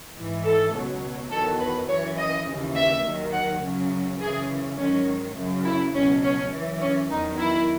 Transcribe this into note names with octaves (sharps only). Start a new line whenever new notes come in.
G#2 E3
A4
C#2 B2 F#3
E2 D#3 F#3 A4
B4
F#2 E3 C#5
D#5
D#2 C#3 E3
E5
D#2 D#3 F#3
F#5
F#2 C#3 F#3
F#2 C#3 E3 G#4
G#2 D#3 F#3 C#4
F#2 C#3 F#3
E4
C#2 B2 F#3 C#4
C#4
F#2 E3
C#4
E2 D#3 F#3 D#4
E4